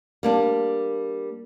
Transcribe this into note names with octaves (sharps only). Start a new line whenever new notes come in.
G3 A#3 D4